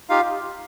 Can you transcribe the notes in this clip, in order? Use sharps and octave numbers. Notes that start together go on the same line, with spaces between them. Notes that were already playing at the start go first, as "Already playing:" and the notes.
D#4 F4 G4 F5